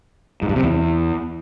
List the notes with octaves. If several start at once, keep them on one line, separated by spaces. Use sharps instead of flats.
G#2
G2
C3
E2